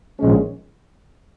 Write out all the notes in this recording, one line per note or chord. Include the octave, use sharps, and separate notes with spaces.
A#1 G#2 D#3 G#3 C#4